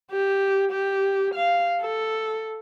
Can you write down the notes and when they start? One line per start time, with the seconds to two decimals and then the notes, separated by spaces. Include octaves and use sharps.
0.11 G4
0.71 G4
1.34 F5
1.81 A4